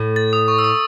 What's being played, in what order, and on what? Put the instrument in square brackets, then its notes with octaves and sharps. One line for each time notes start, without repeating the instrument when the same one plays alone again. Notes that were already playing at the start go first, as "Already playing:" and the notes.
Already playing: [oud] A2
[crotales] A6
D#6
C#6
E6
D#6